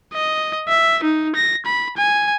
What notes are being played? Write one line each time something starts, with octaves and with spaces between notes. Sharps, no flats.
D#5
E5
D#4
A#6
B5
G#5